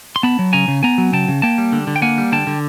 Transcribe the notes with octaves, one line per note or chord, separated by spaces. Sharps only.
C6
B3 A5 B5
F#3
C#3 G#5 A#5
C#3
B3 G#5 A#5
F#3
C#3 G5 A5
C#3
A#3 G5 A5
G3
D3
D3
G5
A#3 F#5 G#5
G3
D3 G5 A5
D3